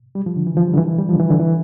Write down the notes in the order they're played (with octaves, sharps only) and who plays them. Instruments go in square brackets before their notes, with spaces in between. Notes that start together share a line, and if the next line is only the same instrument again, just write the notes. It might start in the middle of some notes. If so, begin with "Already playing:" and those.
[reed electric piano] G3
F3
D3
E3
F3
G3
D3
E3
E3
G3
F3
D3
E3
D3
E3